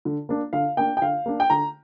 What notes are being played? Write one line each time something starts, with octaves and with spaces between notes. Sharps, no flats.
D3
A#3 D4
D3 F5
A#3 D4 G5
G5
D3 F5
A#3 D4
G5
D3 A#5